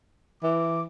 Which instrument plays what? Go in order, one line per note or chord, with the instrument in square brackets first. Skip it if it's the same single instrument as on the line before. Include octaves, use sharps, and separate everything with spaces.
[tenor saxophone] E3 [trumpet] D6